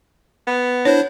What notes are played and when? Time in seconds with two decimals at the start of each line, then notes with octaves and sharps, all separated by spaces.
0.47 B3
0.85 D4 E4 C5 C#5